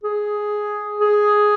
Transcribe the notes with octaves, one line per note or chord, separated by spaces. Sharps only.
G#4
G#4